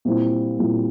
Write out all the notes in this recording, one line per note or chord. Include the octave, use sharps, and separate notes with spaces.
A#2 G3 C4 E4
A#2 G3 C4 E4